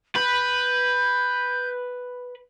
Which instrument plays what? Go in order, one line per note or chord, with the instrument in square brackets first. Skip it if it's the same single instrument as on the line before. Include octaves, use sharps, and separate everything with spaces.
[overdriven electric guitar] B4 [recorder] G6